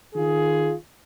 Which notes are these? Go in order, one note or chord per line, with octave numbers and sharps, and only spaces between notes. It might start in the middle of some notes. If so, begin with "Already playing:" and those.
D#3 F4 G#4